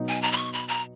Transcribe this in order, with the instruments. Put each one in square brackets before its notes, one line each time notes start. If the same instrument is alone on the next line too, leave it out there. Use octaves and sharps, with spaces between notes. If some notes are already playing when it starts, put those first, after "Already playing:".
Already playing: [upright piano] B2 F#3 B3 D#4
[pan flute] G#5
A#5
B5
C#6
B5
A#5